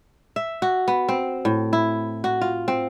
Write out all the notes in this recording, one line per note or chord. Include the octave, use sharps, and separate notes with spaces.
E5
F#4
B3
C4
A2
E4
F#4
F4
C4